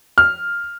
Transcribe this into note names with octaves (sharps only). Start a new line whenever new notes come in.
F6